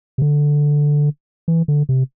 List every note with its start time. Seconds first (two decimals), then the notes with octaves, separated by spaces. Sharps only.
0.18 C3
0.22 D3
1.48 E3
1.68 D3
1.89 C3